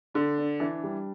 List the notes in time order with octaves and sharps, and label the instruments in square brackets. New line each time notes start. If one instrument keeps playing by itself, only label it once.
[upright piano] D3 [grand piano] D4
[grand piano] D4
[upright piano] E3 [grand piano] D4
[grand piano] G3